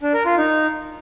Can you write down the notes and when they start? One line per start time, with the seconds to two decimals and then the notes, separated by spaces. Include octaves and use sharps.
0.02 D4
0.14 A#4
0.25 F4
0.37 D#4